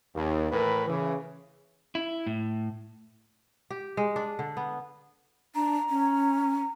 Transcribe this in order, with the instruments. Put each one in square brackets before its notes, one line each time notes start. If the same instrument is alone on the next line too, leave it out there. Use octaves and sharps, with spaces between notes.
[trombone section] D#2
A2 E3 A#4 B4
C#3 E3
[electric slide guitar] E4
A2
[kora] G4
G#3
D4
D3
B3
[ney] D4 [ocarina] A#5
[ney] C#4